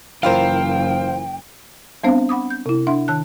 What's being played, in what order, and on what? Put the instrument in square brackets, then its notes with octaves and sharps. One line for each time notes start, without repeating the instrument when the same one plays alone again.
[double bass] F#1 [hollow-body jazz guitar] E3 F4 A#4 [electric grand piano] C5 F5 [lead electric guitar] G5
[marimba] G3 B3 C4 D4 C5 F5
F#5 B5 D6 D#6
G6
C3 E4
D4 E5 F#5 C6
D#3 A5 F#6